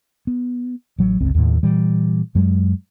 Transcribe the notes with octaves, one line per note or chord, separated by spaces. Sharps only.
B3
A1 F#3
G1 C#2 C4
D#2 A2
A#2 E3 G3
F#2 F#3 G#3